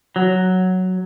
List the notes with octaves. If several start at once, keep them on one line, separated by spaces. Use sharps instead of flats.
F#3